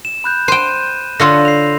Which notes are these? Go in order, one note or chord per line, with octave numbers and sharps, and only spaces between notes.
E7
B5 F#6 G6
C5 G5 D#7 E7
D3 F4 C#5 C6 E6 A#6
C7 F7